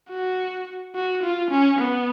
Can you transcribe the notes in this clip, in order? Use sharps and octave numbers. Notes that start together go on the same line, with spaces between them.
F#4
F#4
F4
C#4
B3